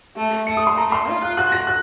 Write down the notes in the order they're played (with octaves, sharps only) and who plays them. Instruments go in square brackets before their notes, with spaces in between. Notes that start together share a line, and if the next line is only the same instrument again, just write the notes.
[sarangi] A3
[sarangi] A3 [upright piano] C#7
[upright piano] D#6
C6
[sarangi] A3 [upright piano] A#5
[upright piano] C6
[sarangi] F4
[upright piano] F#6
[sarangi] F#4 [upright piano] F#6
[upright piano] A#6
F#6